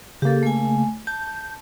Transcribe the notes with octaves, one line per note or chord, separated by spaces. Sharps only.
C#3 A#3 G4 A4
A3 G#5
A5 G6